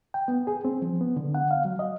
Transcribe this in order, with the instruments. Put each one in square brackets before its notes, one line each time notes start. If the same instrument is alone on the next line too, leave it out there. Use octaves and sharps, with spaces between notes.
[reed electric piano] G5
B3
G#4
C4
F3
B3
D3
F#5
F5
F#3
D#5